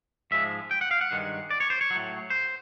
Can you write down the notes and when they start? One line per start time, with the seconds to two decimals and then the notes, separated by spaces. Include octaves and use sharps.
0.31 G#2 F3 G#3 E5
0.71 G5
0.81 F#5
0.91 F5
1.01 F#5
1.11 G2 D#3 G#3
1.51 D5
1.60 C#5
1.70 C5
1.81 C#5
1.90 A2 F#3
2.30 C5